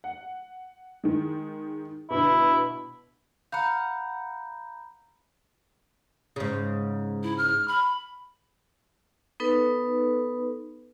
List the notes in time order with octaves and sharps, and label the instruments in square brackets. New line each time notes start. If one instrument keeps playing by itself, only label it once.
[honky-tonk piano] F#5
D#3 G#3
[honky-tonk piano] B2 D3 [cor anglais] E4
[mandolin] F5 F#5 [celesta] A#5 B5 G6
[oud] G#2 C#3
[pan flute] E4
F6
B5
[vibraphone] B3 D#4 A4 B4